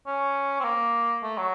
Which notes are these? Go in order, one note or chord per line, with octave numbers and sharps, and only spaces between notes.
C#4
C4
A#3
A3
F#3